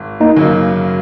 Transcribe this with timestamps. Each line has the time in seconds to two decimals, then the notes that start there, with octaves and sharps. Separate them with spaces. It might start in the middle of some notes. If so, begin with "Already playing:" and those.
Already playing: G#1
0.20 A#3 D#4
0.36 F#2 C#3 F#3 A#3